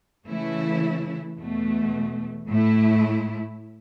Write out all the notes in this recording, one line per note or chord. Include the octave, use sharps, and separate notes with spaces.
C#3 E3 A3 E4
E2 B2 A3
A2 A3 E4